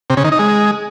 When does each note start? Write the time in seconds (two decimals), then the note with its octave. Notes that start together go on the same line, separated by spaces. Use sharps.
0.10 C3
0.17 C#3
0.24 D#3
0.32 D#4
0.39 G#3